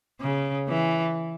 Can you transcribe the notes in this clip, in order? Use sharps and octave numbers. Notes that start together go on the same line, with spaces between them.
C#3
E3